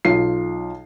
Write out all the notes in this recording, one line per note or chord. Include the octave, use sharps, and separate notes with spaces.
B1 F4 C7